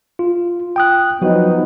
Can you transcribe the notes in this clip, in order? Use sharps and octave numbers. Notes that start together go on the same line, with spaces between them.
F4
G5 D#6 F#6
F3 F#3 B3 D#4 F#4